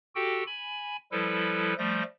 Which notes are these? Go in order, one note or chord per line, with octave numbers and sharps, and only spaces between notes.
F#4 G4 A4 G5
G#5 B5
F3 G3 E4 A4 B4
F3 G3 A3 G6 A#6